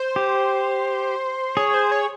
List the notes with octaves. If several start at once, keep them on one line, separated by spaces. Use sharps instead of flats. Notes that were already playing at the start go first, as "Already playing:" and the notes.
Already playing: C5
G4
G#4 C#5
C5
C#5